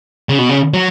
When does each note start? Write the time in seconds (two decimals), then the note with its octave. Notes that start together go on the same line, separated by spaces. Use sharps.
0.29 C#3
0.39 B2
0.49 C#3
0.74 F#3